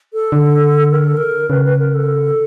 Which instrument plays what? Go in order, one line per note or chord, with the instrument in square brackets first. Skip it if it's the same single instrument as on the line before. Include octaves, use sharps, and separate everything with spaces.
[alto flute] A4
[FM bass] D3
[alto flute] A#4
A4
A#4
[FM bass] C#3 [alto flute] B4
[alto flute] B4
A#4
A4